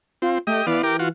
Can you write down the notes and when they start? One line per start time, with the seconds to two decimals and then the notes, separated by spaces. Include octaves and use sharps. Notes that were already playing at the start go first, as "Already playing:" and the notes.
0.22 C4 F4
0.47 A3 G4 D#5
0.67 E3 B3 D5 F5
0.83 G4 A#4 D6
0.99 F4 F#4